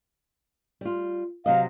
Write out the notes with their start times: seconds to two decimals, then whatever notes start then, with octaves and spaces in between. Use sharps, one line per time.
0.81 G3 F4
1.46 C3 F#3 D#5 F5